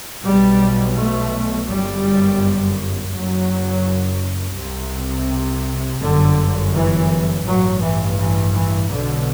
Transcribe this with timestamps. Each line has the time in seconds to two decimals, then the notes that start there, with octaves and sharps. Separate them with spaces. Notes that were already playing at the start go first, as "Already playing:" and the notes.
0.24 B1 B2 G3
0.97 A3
1.68 G1 F#2 G3
3.13 F#1 F#2 F#3
4.57 C2 C3
6.01 G1 F#2 D3
6.73 E3
7.45 A1 G2 F#3
7.81 E3
8.17 E3
8.53 E3
8.89 B1 B2 D3